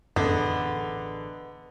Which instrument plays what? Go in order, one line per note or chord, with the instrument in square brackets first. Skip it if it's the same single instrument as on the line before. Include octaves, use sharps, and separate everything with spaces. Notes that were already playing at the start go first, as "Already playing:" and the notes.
[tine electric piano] A1 G#4 D#5 [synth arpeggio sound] F#2 [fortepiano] D3 [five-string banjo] B3